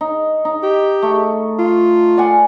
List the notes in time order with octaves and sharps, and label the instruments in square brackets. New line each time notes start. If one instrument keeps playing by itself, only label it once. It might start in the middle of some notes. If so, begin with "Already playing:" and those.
[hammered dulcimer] D#4
D#4
[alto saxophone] G4
[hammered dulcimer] A3
[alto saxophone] F4
[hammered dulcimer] D5 F#5 G#5